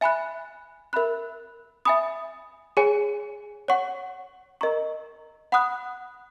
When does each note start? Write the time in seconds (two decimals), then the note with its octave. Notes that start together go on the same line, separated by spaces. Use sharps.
0.01 E5 G#5 B5 F#6
0.93 A#4 E5 B5 F#6
1.85 E5 G#5 B5 D#6
2.77 G#4 C#5 G#5
3.68 C#5 F#5 C#6
4.61 A#4 D#5 A#5 C#6
5.52 F#5 B5 D#6 F#6